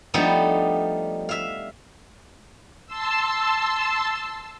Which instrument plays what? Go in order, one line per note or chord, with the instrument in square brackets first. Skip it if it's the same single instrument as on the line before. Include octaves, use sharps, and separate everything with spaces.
[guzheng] F3 G3 A3 B3 D4 D#4
E5 F5
[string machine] A5 C6 E6